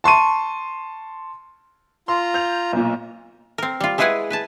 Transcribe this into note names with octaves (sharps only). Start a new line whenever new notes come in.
A5 C6 C#6 D#7
F4 A#5 C6
G6 F7
B1 A#2
C4 A#4
G3 F4
G#3 E4 G#4 B4 F#5 G#5
B4 G#5 A5